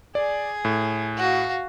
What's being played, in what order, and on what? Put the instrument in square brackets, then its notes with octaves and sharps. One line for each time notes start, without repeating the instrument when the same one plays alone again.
[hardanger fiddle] G#4 [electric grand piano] D5
[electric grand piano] A2
[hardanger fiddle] F#4 F5